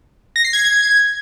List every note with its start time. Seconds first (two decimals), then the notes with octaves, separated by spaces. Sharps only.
0.36 A#6
0.44 C7
0.53 G#6